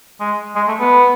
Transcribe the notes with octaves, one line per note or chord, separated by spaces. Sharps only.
G#3
G#3
A3
B3